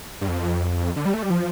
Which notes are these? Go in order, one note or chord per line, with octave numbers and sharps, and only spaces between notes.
G2
F2
D3
G3
A3
G3
F3